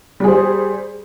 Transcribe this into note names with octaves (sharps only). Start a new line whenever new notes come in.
G3 G#4 C5